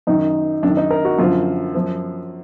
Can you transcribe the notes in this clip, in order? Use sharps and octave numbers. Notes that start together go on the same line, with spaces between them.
F#2 D#3 D#4
F#2 D#3 D4
D#4
A#4
F#4
F#2 D3 F3 F4
F#2 F3